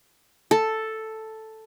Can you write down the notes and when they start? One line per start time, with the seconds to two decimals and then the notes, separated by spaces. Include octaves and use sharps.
0.51 A4